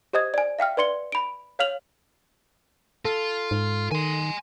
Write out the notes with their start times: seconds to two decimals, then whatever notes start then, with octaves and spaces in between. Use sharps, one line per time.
0.13 G4 C5 D#5 D#6 G#6
0.34 D5 G#5
0.59 E5 F5 G5 F6
0.77 B4 D5 C6 C#7 G7
1.12 B5 D7
1.59 C#5 F5 F6 F7 F#7
3.05 F4 A4
3.51 G#2
3.91 D#3 G#5 C6